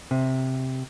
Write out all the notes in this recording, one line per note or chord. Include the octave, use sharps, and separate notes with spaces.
C3